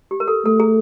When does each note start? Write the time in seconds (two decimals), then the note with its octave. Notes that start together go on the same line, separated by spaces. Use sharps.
0.11 G4
0.20 A#4
0.28 A4
0.45 A3 A4
0.60 G#4